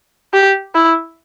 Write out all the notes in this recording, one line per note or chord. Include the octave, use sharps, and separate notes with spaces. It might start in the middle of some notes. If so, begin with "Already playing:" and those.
G4
E4